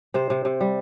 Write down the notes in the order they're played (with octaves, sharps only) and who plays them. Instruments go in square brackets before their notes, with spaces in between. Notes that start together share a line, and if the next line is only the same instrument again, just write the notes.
[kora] C3 C5
C3
C3
G3